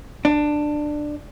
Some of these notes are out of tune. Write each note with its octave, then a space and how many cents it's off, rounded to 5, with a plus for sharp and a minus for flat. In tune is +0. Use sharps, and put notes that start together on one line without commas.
D4 +15